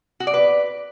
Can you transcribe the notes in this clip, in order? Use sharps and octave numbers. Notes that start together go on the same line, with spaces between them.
F#4
D5
B4